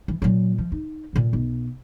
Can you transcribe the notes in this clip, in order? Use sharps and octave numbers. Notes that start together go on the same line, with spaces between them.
E3
A#2 F#3
F3
D#4
A#2 D3
B1